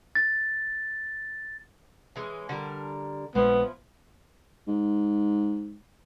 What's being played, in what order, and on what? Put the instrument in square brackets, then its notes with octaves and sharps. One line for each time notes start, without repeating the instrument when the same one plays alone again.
[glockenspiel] A6
[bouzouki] E3 G#3 C#4
D3 G3 A#4
[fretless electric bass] A#1 G#3 [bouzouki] F3 E4 [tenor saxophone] B3
[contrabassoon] G#2